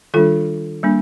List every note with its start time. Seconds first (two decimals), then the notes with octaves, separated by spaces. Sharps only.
0.14 D#3 G3 D4 F4 A4
0.83 G3 A#3 D4